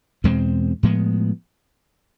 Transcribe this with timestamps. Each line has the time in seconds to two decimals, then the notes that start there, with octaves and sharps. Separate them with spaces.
0.24 E2 B2 G#3 C4
0.83 A2 F3 G#3 B3